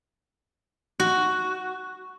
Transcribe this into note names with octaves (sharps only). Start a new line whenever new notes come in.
F#4